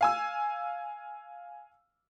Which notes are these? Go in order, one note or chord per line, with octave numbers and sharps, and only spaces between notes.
F5 G#5 E6